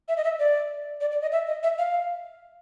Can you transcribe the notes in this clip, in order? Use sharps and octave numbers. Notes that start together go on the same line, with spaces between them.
E5
D#5
E5
D5
D5
D5
D#5
E5
D#5
E5
F5